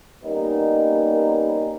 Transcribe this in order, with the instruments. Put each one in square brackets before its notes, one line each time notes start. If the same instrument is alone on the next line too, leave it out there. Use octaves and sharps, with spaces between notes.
[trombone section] G3 A#3 B3 C#4 D#4